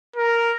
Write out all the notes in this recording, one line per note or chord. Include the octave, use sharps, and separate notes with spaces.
A#4